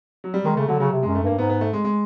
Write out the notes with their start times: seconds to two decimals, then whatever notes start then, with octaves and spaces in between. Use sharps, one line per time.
0.24 F#3
0.34 G3
0.45 D#3 G#3
0.57 C#3 A3
0.68 D3 F#3
0.80 C#3 F#3
0.91 C3
1.03 G#3
1.07 F#2
1.15 A3
1.23 G2 A#3
1.38 G#2 B3
1.49 B3
1.61 A3
1.73 G#3
1.84 G#3